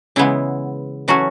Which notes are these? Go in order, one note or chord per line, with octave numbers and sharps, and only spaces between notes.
C#3 E3 G#3 B3 E4
E3 F#3 A3 C#4 F#4